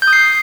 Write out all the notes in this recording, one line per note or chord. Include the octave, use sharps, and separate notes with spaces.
G6
D#6
C7